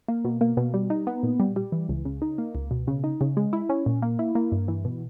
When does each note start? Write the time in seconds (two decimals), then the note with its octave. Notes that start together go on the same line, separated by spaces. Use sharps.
0.08 A#3
0.25 B2
0.41 A#3
0.57 B2
0.74 G3
0.90 D#4
1.07 B3
1.23 A#2
1.40 G3
1.56 G3
1.72 E3
1.89 C#2
2.05 C#3
2.22 D#4
2.38 A#3
2.55 C#2
2.71 B2
2.87 C#3
3.04 D#4
3.21 C#3
3.37 G#3
3.53 E4
3.69 C#4
3.86 A#2
4.02 A#3
4.19 E4
4.35 A#3
4.52 G2
4.68 E3
4.85 B2